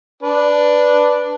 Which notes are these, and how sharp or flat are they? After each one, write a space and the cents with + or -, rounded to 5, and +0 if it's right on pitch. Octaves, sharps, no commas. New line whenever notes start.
D4 +0 B4 +0